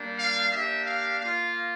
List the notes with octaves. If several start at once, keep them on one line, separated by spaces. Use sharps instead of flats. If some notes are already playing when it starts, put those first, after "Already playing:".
Already playing: G3 A#3 D4
F5
A#3 D4 G4 E5
F5
A#3 F4 F5